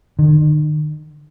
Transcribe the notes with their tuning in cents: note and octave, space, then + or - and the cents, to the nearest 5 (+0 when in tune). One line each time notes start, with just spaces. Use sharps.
D#3 -40